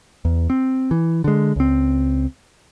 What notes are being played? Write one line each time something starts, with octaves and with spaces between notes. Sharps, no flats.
E2
C4
E3
D3 G#3
C#2 C4